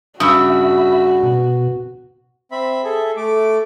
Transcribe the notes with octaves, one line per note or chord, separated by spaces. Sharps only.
G2 C#3 F#4 E5 B5 D#6 E6
B2
C4 E5 B5
G#4 A4 E5
A3 D6